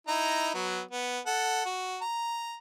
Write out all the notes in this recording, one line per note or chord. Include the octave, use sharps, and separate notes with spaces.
D#4 E4 A#5
F#3 B3
B3
A4 F#5
F#4
A#5